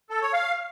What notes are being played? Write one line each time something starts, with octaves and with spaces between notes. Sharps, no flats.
A4
C#5
F5